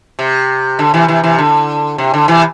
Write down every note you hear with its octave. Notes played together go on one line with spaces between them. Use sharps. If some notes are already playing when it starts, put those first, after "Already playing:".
C3
D3
C3 E3
C3 E3
C3 E3
D3
C3
D3
C3 E3